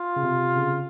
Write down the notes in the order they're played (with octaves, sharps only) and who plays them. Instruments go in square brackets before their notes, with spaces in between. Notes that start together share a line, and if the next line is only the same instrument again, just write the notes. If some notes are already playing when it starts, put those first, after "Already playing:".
Already playing: [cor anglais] F4
[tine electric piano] C#3
C3
C#3